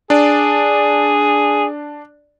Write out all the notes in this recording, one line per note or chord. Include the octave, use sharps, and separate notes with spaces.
D4 G#4 D5